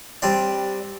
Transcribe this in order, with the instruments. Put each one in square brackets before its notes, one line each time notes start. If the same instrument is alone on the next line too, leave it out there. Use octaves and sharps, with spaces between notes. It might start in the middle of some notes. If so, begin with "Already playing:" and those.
[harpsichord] G3 C4 D4